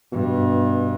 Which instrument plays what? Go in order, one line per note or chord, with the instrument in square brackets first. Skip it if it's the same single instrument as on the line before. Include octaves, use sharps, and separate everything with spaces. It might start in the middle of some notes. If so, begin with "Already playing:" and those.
[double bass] G2 [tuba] B2